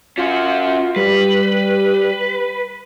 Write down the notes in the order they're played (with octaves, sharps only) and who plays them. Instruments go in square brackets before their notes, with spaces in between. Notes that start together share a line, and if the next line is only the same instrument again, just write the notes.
[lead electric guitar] C#4 F#4 [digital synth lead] F4
[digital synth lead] G3 [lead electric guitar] B4